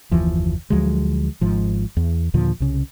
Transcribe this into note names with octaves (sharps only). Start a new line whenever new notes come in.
F#1 D#2 E3 F3
D2 F3 F#3 G#3
G#1 G#2 F3
E2
D#2 A#2 D3 F3
C2 C#3